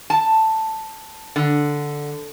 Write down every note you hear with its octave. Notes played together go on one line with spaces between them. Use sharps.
A5
D3